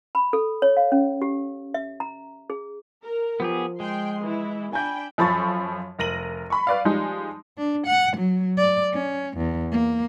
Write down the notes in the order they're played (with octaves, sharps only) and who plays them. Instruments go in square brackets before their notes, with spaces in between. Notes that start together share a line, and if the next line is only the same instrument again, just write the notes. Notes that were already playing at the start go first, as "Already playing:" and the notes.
[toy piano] B5
A4
C#5
F5
C#4
G4
E5
A#5
G#4
[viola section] A#4
[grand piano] F3 [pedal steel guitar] B3 G4 G#4
[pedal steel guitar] G#3 [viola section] G5 C6
[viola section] E3 E4
[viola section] D4 G5 B5 [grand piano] G#5 G6
[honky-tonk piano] F#2 F3 A4 B5 C#6 A6
F1 A#4 A#6 D#7 F#7
B5 C#6
B4 D5 F5
F3 G3 G#3 D#4
[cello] D4
F#5
F#3
D5
C#4
E2
A#3